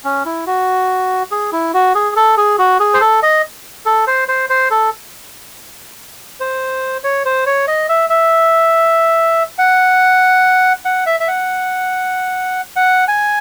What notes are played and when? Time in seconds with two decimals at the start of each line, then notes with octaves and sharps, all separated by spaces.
0.04 C#4
0.25 E4
0.47 F#4
1.31 G#4
1.52 E4
1.74 F#4
1.95 G#4
2.16 A4
2.37 G#4
2.59 F#4
2.80 G#4
2.94 C5
3.01 A4
3.23 D#5
3.86 A4
4.07 C5
4.28 C5
4.50 C5
4.71 A4
6.40 C5
7.04 C#5
7.25 C5
7.46 C#5
7.67 D#5
7.89 E5
8.10 E5
9.58 F#5
10.85 F#5
11.06 E5
11.20 E5
11.28 F#5
12.76 F#5
13.08 G#5